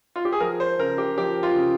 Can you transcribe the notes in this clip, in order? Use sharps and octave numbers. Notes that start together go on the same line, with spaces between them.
F4
G4
G#4
F3 A#4
C5
C#3 A#4
G4
F3 G4
F4
C#3